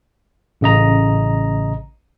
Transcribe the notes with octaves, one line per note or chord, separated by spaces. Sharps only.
A1 C#3 D#5 A#5